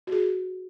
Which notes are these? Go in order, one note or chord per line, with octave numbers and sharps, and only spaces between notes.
F#4
G#4